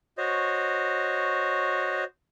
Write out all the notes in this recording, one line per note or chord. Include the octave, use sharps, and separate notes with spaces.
F#4 C5 C#5 D#5